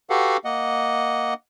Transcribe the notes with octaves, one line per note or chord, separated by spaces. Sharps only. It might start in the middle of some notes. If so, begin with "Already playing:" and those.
F#4 G4 A4 B4 F5 F#5
A#3 D#5 F#5